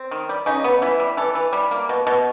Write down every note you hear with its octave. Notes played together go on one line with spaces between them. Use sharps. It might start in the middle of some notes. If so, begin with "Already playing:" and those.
Already playing: C4
D#3
G3
C#3 D#4
B3
E3 E4
G3
E3 A4
E3
G3
A#3
B2
B2